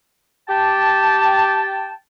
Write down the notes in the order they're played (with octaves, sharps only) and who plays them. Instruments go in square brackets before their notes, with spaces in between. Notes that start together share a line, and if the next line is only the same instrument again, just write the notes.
[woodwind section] G4 G5 A5